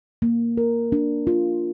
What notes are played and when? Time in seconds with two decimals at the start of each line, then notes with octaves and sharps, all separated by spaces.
0.22 A#3
0.57 A#4
0.92 D4
1.27 F4